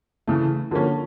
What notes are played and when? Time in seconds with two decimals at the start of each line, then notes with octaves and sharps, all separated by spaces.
0.27 C#3 E3 A3
0.71 D3 F3 A#3 C#4